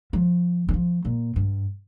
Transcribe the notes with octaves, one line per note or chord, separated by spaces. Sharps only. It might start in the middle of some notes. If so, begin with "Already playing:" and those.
F3
D#3
F3
A#2
G2